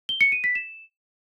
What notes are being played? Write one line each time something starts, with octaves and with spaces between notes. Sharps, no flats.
G7
C#7
D#7
B6
E7